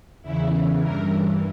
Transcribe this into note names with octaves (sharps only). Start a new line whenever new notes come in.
E2 C#3 E3 E4
G2 E3 A#4